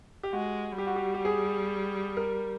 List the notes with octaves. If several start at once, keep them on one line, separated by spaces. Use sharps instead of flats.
G4
G#3 F#4
G3 G4
F#4
G4
G4
G#4
A#4